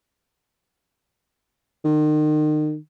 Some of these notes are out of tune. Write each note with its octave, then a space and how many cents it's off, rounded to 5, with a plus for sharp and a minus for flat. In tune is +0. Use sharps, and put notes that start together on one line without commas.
D#3 -35